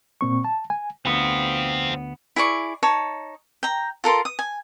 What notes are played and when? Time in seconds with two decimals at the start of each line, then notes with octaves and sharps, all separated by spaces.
0.21 A#2 C4 C#6
0.45 A5
0.70 G#5
1.06 D2 B3 C4 F4
2.36 E4 G#4 D5 C#6
2.83 D#4 C#5 A5
3.63 G5 A#5
4.04 F4 A4 A#4 C6
4.25 D#6
4.39 G#5